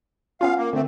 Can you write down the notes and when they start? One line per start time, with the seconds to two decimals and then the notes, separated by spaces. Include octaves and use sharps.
0.41 B3 C#4 F4 F5
0.57 A#3
0.73 D3 A3 C4